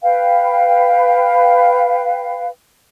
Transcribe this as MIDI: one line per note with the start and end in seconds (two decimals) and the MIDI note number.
0.03 2.48 71
0.03 2.48 77
0.03 2.48 79